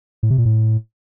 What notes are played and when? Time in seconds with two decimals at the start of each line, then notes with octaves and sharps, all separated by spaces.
0.23 A2
0.30 C3
0.38 A#2
0.45 A2